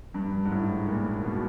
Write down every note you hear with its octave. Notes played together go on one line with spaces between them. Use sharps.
G2
G#2
A2
A#2
B2